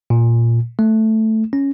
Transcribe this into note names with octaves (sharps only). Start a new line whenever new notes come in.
A#2
A3
C#4